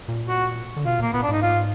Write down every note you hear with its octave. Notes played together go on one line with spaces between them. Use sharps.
A#2
F#4
D3
B2 F4
A#2 A#3
A#2 B3
D4
G#2 D#4
F4